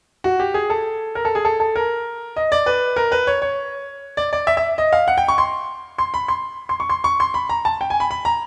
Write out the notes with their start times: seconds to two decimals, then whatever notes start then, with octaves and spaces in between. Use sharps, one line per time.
0.24 F#4
0.40 G4
0.54 G#4
0.70 A4
1.15 A#4
1.25 A4
1.35 G#4
1.45 A4
1.60 A4
1.76 A#4
2.36 D#5
2.52 D5
2.66 B4
2.96 A#4
3.12 B4
3.27 C#5
3.42 C#5
4.17 D5
4.33 D5
4.47 E5
4.57 E5
4.78 D#5
4.93 F5
5.08 F#5
5.18 G5
5.28 C#6
5.38 C6
5.98 C6
6.14 B5
6.28 C6
6.69 C6
6.80 C#6
6.90 C6
7.04 C#6
7.20 C6
7.34 B5
7.49 A#5
7.65 A5
7.81 G5
7.90 G#5
8.00 B5
8.11 B5
8.25 A#5